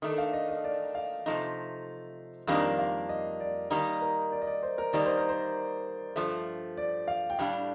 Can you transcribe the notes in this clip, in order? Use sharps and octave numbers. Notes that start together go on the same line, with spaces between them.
D#3 A3 D4
F5
D#5
D#5
D5
F5
C3 F3 A3 D#4
F2 D#3 G3 A#3 D4 F5
F5
D#5
D5
D#3 G3 A#3 D#4
A#4
D5
D#5
D5
C5
A#4
D#3 G3 A#3 D#4 D5
C5
A#4
C5
G2 F3 A3
D5
F5
G5
A2 G3 D4 F5